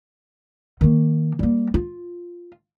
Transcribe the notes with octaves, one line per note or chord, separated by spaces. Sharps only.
D#3 A#3
G3 A#3
F4